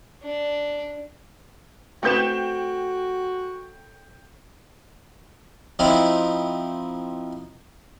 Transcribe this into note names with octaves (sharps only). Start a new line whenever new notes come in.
D4
A3 C4 F#4 B4 G5 G6 E7
F3 C4 D#4 E4